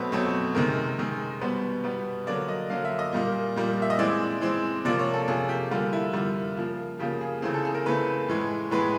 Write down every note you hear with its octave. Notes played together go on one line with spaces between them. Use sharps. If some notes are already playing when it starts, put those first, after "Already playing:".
Already playing: B2 F#3 A3 C4 B4
B2 F#3 A3 C4
C3 D#3 G#3 A#4
C3 D#3 G#3
B2 G3 B3 C5
B2 G3 B3
D3 F#3 A#3 D5
D#5
D3 F#3 A#3 F5
E5
D#5
A#2 G3 A#3
A#2 G3 A#3
E5
D#5
E3 G#3 C4 D5
E3 G#3 C4
C3 F3 A#3 D5
C#5
A4
C3 F3 A#3 G#4
G4
D3 G3 A#3 F4
E4
D3 G3 A#3 F4
C#3 F3 A#3
C#3 F3 A#3 G4
G#4
C#3 E3 A3 C4 G#4
A4
G#4
A#4
C#3 E3 A3 C4 B4
A2 E3 G#3
A2 E3 G#3 B4